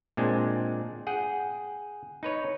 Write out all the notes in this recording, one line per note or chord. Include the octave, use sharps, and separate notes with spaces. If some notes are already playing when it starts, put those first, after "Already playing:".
A#2 G#3 C4 D4
G#4 F#5 G5
D#4 B4 C#5